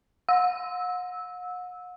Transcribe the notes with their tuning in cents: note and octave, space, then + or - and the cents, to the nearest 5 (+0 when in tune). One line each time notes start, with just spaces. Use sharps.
F#5 -40 E6 -15